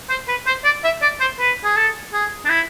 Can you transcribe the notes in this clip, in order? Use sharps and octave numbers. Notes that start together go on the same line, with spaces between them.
C5
B4
C5
D5
E5
D5
C5
B4
G#4
A4
G#4
D4
E4